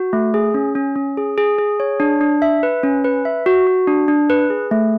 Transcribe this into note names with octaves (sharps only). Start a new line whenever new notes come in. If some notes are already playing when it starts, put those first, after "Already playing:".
Already playing: F#4
A3
G#4
C#4
C#4
C#4
G#4
G#4
G#4
C#5
D4
D4
E5
B4
C#4
B4
E5
F#4
F#4
D4
D4
B4
G#4
A3